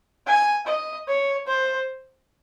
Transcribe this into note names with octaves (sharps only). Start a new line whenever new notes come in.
G#5
D#5
C#5
C5